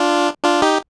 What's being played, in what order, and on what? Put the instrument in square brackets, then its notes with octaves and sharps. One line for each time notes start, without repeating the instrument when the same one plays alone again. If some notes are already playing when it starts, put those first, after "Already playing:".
Already playing: [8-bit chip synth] D4 F4
D4 F4
D#4 G4